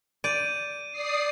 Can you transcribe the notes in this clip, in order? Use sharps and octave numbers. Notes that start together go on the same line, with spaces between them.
D5 G6 D#7
D5 D#6 C7